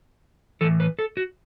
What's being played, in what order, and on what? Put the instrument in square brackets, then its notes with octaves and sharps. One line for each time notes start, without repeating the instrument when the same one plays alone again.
[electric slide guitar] A2 E3 A4
B4
A4
F#4